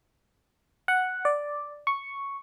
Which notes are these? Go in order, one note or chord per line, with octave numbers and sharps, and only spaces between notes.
F#5
D5
C#6